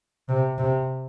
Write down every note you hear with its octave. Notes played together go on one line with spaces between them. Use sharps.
C3
C3